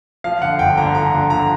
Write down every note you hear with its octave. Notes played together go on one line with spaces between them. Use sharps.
F3 F5
D3 F#5
G1 G5
D3 A#5
F3 A#5
D3
D3 A#5